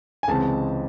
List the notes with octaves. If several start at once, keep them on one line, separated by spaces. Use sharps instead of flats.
G#5
C#2 C3 E3 G#3 C4 A5